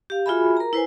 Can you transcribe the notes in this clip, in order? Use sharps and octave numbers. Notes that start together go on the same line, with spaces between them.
G4 F5
F4 F#4 G#4 E5 G#5 B5
A#4 A#5
E4 B4 C5 G#5